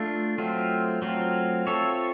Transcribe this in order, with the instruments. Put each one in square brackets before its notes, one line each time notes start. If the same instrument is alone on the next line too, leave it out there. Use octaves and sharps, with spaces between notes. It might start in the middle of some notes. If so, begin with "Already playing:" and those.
Already playing: [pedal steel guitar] A3 D4 F4
F#3 A3 C4 F4
F#3 A3 C4 F4
C4 F4 A4 C#5 E5